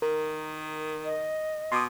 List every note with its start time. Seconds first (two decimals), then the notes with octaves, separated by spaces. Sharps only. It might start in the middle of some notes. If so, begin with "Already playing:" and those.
0.02 D#3 A#4
1.05 D#5
1.72 B2 C6 D6 D#6